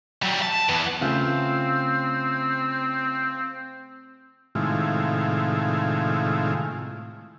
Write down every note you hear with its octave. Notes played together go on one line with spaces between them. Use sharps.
F#3 G3
A5
E3 B3
C#3 A3 C4 F4
A2 C3 D#3 G#3 E4 F4